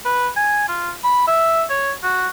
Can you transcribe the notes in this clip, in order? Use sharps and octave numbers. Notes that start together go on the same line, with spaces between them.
B4
G#5
F4
B5
E5
C#5
F#4